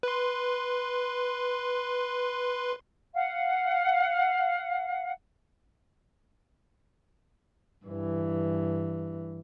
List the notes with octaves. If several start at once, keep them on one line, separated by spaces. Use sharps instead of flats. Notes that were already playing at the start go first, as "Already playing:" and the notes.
B4 C6
F5 F#5
G2 E3